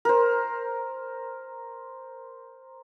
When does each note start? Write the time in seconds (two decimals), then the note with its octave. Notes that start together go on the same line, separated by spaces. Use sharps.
0.05 A#4 C5